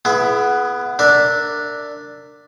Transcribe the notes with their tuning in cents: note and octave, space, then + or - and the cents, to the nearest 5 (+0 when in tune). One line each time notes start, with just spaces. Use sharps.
B3 +0 E4 +35 G#4 +30
D4 +0 A#4 -25 E5 +0